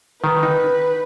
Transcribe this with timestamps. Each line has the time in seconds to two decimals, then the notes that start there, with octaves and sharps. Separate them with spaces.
0.23 D#3 B4
0.43 D#4